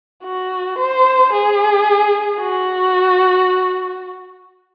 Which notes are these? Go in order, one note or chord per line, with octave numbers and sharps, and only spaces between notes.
F#4
C5
G#4
F#4